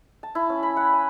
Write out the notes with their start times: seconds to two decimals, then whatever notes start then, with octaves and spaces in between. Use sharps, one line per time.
0.23 A5
0.35 E4
0.49 C#4
0.63 B5
0.77 F#5
0.93 G#5